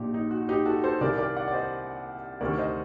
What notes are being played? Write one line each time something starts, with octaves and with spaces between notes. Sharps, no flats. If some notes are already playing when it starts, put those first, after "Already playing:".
Already playing: A#1 A#2 D#4 G4
D#4
F#4
D#4 G4
F#4 A4
A4 C5
C2 C3 D#3 A#4 D5
A#4 D5
D5 F#5
D5
C5 D#5
D2 C3 D#3 A#4 D5
C5 D#5